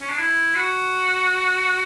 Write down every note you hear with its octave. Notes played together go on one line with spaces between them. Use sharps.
C#4
D4
E4
F#4